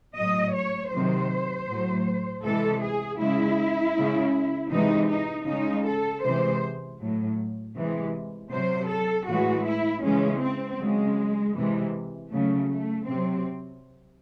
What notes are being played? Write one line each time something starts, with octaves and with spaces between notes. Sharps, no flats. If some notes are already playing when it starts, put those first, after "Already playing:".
A2 F#3 D#5
C#5
C3 D#3 F#3 C5
A2 F#3
C3 E3 G#3 A4
G#4
C#3 G#3 E4
C#3 G#3
C3 E3 G#3 D#4
D#4
C#3 G#3 D#4
A4
C3 E3 G#3 C5
A2 F#3
C3 E3 G#3
C3 F#3 C5
A4
A2 E3 G#3 F#4
E4
C#3 E3 G#3 C#4
C4
C#3 F#3 G#3
C3 E3 G#3
C#3 F#3 A3
A3
C3 F#3 C4